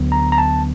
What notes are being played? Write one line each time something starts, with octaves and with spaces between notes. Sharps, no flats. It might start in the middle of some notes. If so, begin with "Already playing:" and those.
Already playing: D2 D3 F#3 B3
A#5
A#5
A5